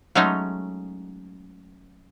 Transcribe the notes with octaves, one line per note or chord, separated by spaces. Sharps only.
F#3 G#3 A3 C#4 D#4